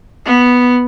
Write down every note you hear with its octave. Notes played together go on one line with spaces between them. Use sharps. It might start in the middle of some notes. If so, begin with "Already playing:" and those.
B3